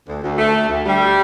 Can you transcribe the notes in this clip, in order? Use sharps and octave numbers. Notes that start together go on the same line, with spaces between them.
D2
D2
D2 A3
D2
D2
D2 G3